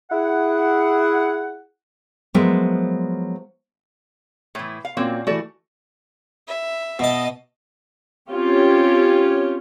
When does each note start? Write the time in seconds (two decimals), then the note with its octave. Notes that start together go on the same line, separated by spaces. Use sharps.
0.11 E4 G#4 F#5
2.34 F3 F#3 G#3 B3 A#4 E5
4.55 A2 E3
4.85 F5
4.97 A#2 A#3 C4 C#4 F#4 D5
5.27 E3 A3 F#4 D5
6.48 E5
6.99 B2 D#5 A5
8.30 C4 C#4 F4 G4 C#5